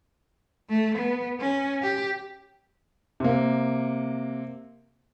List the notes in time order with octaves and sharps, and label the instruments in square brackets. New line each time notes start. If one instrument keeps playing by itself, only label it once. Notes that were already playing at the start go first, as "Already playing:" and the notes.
[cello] A3
B3
C#4
G4
[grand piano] C3 A#3